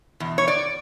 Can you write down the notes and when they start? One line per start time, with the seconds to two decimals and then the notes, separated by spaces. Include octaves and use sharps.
0.20 E2 B2
0.38 C#5
0.48 D5